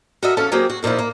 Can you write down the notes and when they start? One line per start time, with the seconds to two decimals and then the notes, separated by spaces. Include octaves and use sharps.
0.23 F#4 A4 A#4 D#5 E5
0.37 E2 C#4 A4 F5 A5
0.52 F#3 A#3 C4 G4 G#4
0.69 F#4
0.83 E2 A#2 F3 D#4 E4
0.99 A#3